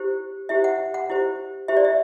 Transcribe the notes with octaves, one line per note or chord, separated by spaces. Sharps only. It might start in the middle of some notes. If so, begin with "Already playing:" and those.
Already playing: E4 G4 C5
E4 G4 C5 E5
F#5
F#5
E4 G4 C5
E4 G4 C5 E5
D5
E5